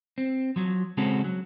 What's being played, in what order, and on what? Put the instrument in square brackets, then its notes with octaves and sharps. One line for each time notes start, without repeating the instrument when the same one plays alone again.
[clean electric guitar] C4
F3 F#3
C#3 G#3 C4 C#4 F#4 A4
F#3